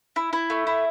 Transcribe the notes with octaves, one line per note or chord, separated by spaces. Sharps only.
E4
E4
A3
E4